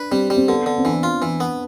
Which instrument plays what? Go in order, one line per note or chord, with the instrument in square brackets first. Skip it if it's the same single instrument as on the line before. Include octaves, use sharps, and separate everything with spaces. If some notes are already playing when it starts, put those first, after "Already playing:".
Already playing: [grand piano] D4 [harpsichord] B4
[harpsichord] G3 [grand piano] C4
[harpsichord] G3
[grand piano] C4
[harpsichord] D3 [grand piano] B3
[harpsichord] D3
[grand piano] C4
[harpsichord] E3 [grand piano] D4
[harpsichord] F4
E3
B3